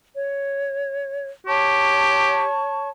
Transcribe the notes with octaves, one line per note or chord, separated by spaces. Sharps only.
C#5
G4 C#5 A5 C#6